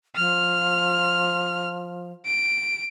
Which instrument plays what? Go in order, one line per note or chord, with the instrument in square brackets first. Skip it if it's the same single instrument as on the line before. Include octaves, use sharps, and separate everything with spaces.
[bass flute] F3 [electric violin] F6
[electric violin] D7